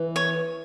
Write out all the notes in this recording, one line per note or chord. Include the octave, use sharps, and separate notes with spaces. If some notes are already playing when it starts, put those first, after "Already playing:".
Already playing: E3
C#5